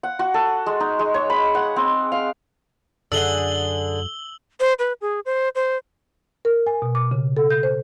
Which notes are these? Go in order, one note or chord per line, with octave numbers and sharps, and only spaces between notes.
F#5
F#4
A4
G#3
D#4
G#3
C#5
B5
F#5
C4
F5
F#2 D3 G#4 F#5 E6 F#7 G7
C5
B4
G#4
C5
C5
A#4
G#5
B2
D6
C#3
A4
G6
C5